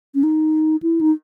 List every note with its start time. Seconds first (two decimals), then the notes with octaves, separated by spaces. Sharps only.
0.15 C#4
0.23 D#4
0.83 E4
1.01 D#4